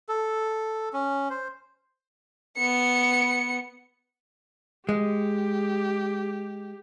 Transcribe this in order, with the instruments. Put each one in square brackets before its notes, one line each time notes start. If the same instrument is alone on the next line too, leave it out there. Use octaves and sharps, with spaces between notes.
[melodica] A4
C#4
C5
[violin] B3 C#7
[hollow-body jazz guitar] G#3 [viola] G4